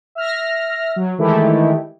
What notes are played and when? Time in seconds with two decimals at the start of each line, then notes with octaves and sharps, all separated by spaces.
0.15 E5 F6 A#6
0.96 F#3
1.18 D#3 E3 G#3 A3 E4 G4